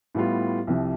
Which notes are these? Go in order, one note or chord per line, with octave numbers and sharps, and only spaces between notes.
A2 G3 B3 F4
C2 C3 F3